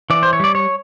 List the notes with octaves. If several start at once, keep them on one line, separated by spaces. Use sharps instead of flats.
E3 D5
C5
C#5
G3 D5
C#5